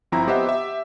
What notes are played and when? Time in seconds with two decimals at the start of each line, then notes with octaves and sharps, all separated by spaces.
0.12 G1 F3 C4 E4 A#5
0.27 B3 G4 C5 D#5 E5 F#5
0.47 G4 E5